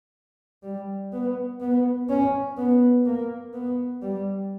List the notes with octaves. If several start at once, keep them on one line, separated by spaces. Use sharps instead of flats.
G3
B3
B3
C#4
B3
A#3
B3
G3